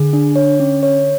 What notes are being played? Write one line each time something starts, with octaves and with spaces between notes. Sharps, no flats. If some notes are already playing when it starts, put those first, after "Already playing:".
Already playing: D3 G#4
D4
C#5
C#4
C#5